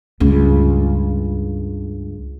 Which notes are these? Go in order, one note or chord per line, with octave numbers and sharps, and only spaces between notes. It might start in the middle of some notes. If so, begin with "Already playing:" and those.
C#2 G2